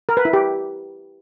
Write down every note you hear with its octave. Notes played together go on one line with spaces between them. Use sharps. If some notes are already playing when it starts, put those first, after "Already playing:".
A#4
B4
E4
G4